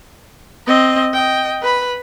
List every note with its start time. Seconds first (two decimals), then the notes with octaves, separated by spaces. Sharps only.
0.67 C4 D#5
1.14 D#5 G5
1.62 B4 B5